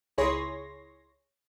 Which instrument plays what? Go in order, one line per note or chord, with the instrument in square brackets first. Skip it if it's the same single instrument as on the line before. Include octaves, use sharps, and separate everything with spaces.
[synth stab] C#2 E4 G#4 C#5 C6 A#6